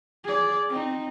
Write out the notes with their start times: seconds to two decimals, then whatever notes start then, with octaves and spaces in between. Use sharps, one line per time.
0.24 G#4 D5
0.69 C4 D#4